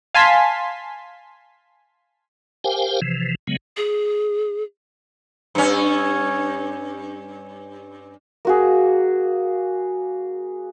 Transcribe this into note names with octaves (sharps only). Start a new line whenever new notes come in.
F5 G#5 A5 C6 B6
G4 A#4 C5 F5 G5 G#5
C3 E3 F3
C#3 F#3 G#3 B3
G#4
G2 C#4
A#3 F#4 G#4